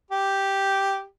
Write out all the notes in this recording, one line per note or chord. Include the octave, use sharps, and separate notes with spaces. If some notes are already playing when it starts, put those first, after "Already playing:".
G4